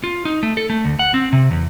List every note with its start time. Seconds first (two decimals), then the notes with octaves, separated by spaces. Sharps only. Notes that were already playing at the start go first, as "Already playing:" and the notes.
0.04 F4
0.25 D#4
0.43 A3
0.57 A4
0.70 A3
0.84 D2
0.99 F#5
1.14 C4
1.33 C3
1.51 E2